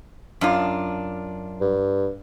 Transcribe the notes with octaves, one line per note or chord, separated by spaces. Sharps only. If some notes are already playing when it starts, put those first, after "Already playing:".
F#2 D4 F4
G2